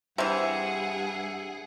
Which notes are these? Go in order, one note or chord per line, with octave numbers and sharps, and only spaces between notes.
G2 C3 E3 G#4 E5 F#5